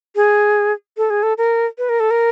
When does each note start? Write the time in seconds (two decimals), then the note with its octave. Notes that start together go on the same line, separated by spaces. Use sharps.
0.16 G#4
0.97 A4
1.10 G#4
1.23 A4
1.38 A#4
1.78 B4
1.89 A#4
2.00 A4
2.11 A#4